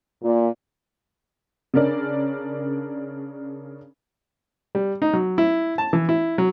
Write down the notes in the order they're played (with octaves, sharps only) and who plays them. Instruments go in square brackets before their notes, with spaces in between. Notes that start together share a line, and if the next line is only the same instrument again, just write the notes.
[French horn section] A#2
[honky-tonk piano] C#3 C#4 D4 A#4 D5
[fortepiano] G3
D#4
F#3
E4
A5
E3
E4
F#3